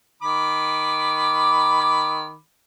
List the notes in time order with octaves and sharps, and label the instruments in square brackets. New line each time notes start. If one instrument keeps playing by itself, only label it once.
[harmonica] D#3 B5 D6